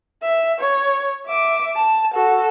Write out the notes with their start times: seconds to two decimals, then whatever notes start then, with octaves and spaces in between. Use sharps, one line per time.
0.22 E5
0.60 C#5
1.26 E5 D6
1.76 A5
2.14 F#4 A4